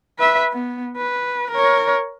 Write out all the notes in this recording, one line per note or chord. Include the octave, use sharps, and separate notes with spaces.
B4 E5
B3
B4
A#4 C#5